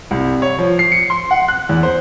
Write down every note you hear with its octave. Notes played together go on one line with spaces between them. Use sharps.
C2
C#5
F3
C7
C#7
C6
F#5
F#6
E2
C5